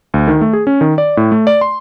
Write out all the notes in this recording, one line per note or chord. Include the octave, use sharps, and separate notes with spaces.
D2
D#3
A3
G#4
C#4
D#3
D5
A2
A3
D5
C6